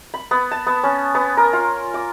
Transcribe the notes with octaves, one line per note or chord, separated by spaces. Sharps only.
B5
B3
A5
B3
C#4
B3
A#4
F4
D6